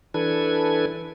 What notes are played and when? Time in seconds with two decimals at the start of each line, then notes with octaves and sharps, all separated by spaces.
0.14 E3 D4 A4 B4 G#6